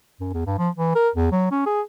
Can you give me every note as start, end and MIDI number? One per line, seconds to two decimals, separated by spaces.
0.20 0.29 42
0.34 0.42 40
0.46 0.56 43
0.58 0.69 53
0.76 0.93 52
0.95 1.09 70
1.15 1.29 40
1.32 1.49 54
1.51 1.65 61
1.66 1.81 68